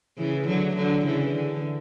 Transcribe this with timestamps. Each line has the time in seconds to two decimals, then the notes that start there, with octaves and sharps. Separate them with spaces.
0.18 C#3 E3
0.47 D3 F#3
0.76 D3 F#3
1.06 C#3 E3
1.34 D3